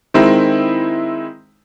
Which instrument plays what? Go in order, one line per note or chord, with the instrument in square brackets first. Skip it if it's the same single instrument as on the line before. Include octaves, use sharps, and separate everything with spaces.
[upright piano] D#3 G#3 C4 D#4 E4